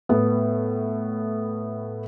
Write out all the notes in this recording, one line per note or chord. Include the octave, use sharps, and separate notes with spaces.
A2 B3